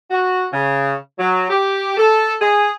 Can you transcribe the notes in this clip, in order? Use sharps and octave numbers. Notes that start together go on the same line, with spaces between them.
F#4
C#3
F#3
G4
A4
G#4